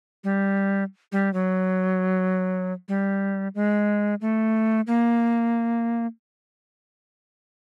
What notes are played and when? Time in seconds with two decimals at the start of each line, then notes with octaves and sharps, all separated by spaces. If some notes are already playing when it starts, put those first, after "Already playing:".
0.24 G3
1.12 G3
1.34 F#3
2.88 G3
3.55 G#3
4.21 A3
4.87 A#3